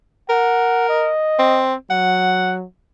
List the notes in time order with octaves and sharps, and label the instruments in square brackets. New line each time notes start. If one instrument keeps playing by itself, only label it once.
[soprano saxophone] A#4 [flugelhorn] F#5
[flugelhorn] D#5
[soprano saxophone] C4
[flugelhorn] F#3 [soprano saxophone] F#5